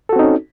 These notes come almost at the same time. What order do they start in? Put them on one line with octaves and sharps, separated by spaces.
A4 F#4 C4 D#4 C#4